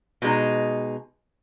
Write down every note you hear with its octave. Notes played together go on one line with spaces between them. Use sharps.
B2 G#3 D#4